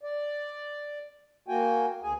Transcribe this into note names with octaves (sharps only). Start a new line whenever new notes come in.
D5
A#3 F#4 G5 G#5
D2 G#4 G#5